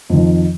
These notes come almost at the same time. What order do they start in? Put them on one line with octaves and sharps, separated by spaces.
F2 D#3 F3